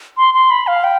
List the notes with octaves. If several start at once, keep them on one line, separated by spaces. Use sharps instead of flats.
C6
C6
B5
F5
G5